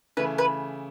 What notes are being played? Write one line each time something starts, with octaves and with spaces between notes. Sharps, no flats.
C#3 E3 A3 E4 B4
B4